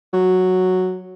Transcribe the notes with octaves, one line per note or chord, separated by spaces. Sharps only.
F#3